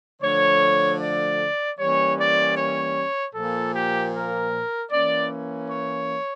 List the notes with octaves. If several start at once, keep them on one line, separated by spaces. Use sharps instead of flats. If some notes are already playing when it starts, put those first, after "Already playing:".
D3 F3 A3 C#5
D5
E3 G3 A#3 C#4 C#5
D5
C#5
A#2 F3 A#3 A4
G4
A#4
E3 A#3 C#4 D5
C#5